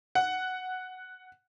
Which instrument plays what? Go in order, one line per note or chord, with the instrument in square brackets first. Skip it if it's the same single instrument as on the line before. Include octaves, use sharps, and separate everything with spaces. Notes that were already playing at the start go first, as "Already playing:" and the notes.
[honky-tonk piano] F#5